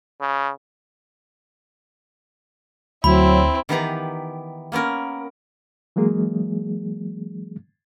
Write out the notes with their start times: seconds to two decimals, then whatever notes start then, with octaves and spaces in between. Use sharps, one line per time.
0.21 C#3
3.04 D2 F#3 C4 E4 B5
3.69 D#3 E3 B3 G4 B4 A#5
4.72 A#3 B3 C#4 A#4
5.96 E3 F#3 G#3 A#3 G#4